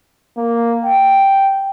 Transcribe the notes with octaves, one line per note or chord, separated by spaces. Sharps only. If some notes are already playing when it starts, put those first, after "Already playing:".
A#3
G5